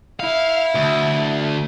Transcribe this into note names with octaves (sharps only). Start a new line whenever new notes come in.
E4 F5
D2